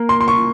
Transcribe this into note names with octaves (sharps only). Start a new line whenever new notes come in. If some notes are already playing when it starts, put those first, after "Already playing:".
Already playing: A#3
C6
C6
C#6